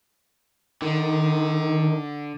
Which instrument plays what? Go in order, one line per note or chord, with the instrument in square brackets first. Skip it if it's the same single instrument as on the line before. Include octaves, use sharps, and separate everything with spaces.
[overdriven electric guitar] D3 [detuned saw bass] D#3